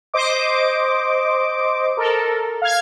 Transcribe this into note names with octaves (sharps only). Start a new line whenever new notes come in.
C5 D#5 D6
A4 A#4
F5 F6 G#6